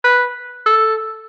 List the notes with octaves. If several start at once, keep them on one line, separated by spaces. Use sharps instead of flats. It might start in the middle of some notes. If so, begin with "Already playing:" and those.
B4
A4